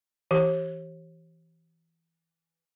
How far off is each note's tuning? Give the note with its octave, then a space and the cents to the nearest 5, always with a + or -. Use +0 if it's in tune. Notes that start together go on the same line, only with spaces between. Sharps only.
E3 +0 G4 -30